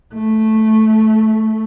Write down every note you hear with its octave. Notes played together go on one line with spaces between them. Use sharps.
A3